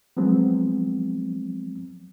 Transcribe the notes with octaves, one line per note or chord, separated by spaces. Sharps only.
F3 F#3 G#3 B3 C4